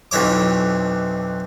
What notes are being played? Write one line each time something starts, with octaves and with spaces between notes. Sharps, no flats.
B1 F2 E3 C#5 D6